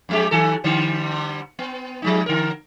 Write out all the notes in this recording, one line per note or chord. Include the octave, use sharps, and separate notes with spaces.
F2 G#3 G4
D#3 A4
D3 G3 C5
B3
F3 G#3 D#4
D3 A#4